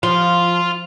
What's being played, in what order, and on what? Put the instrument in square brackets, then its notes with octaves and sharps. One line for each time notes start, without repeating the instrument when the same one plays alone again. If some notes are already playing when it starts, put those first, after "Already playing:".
[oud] F3 [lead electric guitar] F5 C6